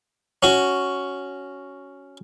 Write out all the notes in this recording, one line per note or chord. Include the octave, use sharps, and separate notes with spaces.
C#4 F#4